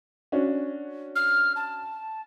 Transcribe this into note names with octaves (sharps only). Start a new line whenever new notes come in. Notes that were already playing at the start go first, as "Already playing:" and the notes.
C#4 D4 F#4
F6
A5